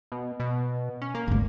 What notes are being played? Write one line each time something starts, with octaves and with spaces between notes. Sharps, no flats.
B2
B2
C#4
A#3
G#1 D2